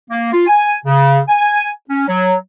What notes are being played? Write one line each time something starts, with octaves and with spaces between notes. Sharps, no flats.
A#3
F4
G#5
C#3
G#5
C#4
F#3